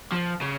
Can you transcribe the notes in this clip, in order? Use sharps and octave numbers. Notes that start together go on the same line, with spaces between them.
F3
C#3